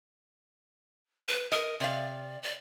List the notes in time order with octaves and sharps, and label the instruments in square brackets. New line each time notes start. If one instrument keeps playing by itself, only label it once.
[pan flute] B4
[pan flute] A#4 [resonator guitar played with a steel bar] D#5
[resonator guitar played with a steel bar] C3 F5 [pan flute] D5
[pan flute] D5